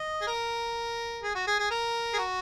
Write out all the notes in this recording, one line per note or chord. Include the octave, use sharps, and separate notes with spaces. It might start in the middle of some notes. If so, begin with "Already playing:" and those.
Already playing: D#5
G#4
A#4
G#4
F#4
G#4
G#4
A#4
G#4
F#4